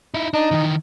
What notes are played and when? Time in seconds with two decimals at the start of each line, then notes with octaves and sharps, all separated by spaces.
0.14 D#4 E4
0.34 D4 D#4
0.51 D#3 E3